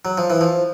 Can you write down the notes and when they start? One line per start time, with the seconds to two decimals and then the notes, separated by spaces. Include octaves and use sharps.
0.05 F#3
0.18 F3
0.30 E3
0.41 F3